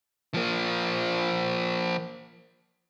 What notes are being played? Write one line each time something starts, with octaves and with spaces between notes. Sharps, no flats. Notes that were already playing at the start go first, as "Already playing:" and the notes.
F3 A#3